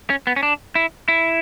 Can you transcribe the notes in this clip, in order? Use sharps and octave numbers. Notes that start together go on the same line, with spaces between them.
C#4
B3
C#4
D4
E4
E4